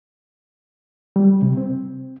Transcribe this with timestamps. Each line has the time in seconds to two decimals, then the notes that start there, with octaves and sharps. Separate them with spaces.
1.16 G3
1.42 C3
1.57 C4